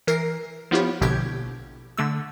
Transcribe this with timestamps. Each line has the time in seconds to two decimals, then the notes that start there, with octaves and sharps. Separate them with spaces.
0.07 E3 A#4 C7
0.71 F3 B3 E4 F4 G4 C#5
1.01 A#1 B2 D3 G4 G6 G#6
1.97 D3 A3 E6